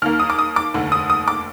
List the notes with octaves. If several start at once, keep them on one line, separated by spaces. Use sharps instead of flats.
D#2 D#3 A#3 F6
D#6
D6
D#6
D6
F1 D#2 D3
D#6
D#6
D6